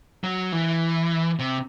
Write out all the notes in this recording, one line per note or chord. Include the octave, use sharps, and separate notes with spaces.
F#3
E3
C3